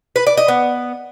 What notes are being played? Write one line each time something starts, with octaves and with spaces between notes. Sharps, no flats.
B4
D5
D#5
B3